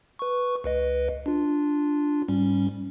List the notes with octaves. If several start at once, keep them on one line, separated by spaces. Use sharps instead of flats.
B4 C#6
C#2 B4 D#5
D4 F4
G#2 G3 C#4